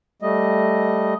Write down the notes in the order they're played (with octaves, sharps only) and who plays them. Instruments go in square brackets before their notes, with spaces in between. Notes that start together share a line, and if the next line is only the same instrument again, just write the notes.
[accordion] G3 A3 D#5